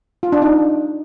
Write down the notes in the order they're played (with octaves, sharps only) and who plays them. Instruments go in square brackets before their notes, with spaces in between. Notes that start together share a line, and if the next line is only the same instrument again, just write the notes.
[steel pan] F4
D4
D#4